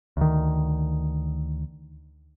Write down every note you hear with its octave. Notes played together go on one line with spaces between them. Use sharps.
D2 D#3